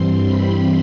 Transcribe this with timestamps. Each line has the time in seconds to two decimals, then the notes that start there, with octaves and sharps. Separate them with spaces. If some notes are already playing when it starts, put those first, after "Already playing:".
Already playing: G2 E3 G3 C4 C6
0.22 B5